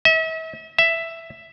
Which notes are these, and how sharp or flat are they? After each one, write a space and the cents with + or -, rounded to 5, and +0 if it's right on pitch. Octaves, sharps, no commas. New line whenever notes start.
E5 -40
E5 +5